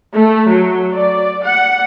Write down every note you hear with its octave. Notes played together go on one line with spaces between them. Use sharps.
A3
F#3
D5
F#5